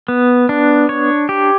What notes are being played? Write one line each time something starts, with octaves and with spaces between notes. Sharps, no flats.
B3
D4
C#5
G4